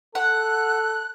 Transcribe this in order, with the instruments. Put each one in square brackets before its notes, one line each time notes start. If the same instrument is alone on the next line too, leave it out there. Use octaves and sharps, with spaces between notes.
[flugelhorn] A4 [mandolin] F#5 [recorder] F#6